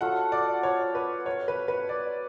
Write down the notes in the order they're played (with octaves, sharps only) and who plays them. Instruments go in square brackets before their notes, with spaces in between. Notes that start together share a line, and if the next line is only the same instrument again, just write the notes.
[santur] F#3 A3 F4 A4 [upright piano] F#5
[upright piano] D5
C#5
B4
C#5
B4
B4
D5